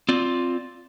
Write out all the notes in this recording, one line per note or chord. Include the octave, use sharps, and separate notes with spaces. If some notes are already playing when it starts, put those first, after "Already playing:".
C4 F4 D5